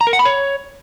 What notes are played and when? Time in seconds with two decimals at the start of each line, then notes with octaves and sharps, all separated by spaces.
0.01 A#5
0.07 A#4
0.13 F#5
0.19 B5
0.25 C#5